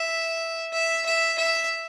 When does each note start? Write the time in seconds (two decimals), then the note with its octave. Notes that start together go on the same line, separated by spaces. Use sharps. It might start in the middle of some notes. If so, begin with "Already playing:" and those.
Already playing: E5
0.73 E5
1.05 E5
1.38 E5